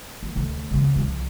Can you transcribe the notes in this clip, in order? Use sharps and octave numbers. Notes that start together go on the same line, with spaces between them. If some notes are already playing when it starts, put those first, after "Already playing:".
A#3
D2 C3
C#3 B3
C2 F3